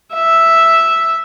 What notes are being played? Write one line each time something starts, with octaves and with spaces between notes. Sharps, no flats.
E5